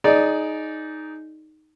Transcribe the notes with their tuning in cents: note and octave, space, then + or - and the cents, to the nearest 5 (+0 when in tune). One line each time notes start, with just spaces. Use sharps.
D#4 +0 G#4 +20 D5 -10